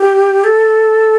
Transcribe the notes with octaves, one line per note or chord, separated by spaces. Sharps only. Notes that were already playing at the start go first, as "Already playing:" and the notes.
Already playing: G4
A4